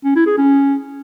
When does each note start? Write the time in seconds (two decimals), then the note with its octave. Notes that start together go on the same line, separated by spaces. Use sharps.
0.04 C#4
0.15 E4
0.26 G#4
0.37 C#4